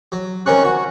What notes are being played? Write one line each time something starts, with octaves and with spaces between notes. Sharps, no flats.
F#3
C3 D#3 C#4 A#4 C#6 F#6
F#4 C#5